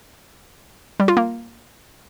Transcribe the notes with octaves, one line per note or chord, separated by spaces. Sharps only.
G3
F4
A#3